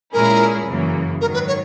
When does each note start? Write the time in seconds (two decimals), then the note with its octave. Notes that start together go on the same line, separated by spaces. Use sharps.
0.13 A#2 G#3 C#4 E4 G#4 A#4
0.67 F#2 C#3 E3 A#3
1.21 G#2 D#3 F#3 A#4
1.34 B4
1.48 C#5